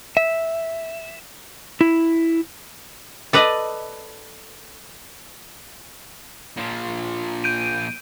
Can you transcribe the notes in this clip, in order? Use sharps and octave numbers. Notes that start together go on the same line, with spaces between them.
E5
E4
A4 B4 D5 D#5
A#2 F3
G6 D7 D#7